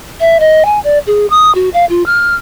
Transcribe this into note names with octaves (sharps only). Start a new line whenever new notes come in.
E5
D#5
G#5
D5
G#4
D#6
F#4
F5
F4
F6